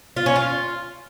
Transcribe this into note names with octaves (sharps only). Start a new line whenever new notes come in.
F4
C#4
F4